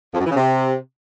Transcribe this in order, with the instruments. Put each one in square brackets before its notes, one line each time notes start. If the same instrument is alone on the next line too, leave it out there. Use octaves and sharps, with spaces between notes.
[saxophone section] F2
F#2
E3
C#3
C3